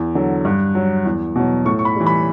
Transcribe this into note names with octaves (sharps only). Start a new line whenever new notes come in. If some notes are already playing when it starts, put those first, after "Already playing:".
Already playing: E2
D3 F#3
G2
F#3
E2
B2 F#3
A2 C#6
C#6
B5
E3 G3
B5